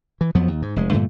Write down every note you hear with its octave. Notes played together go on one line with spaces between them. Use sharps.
E3
F2 F3 F#3 B3
D#2
G#2
F1 G#3
G2 A#2 D3 A3